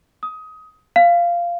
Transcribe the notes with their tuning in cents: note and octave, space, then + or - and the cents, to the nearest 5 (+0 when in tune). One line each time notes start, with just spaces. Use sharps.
D#6 +20
F5 -10